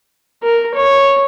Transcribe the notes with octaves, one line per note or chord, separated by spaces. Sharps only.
A#4
C#5